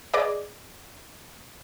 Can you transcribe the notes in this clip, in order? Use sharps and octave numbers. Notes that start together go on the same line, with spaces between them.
G#4 B4 D5 D#5 D6